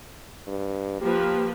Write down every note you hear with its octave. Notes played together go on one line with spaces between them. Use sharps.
G2
F3 A#3 G4 B4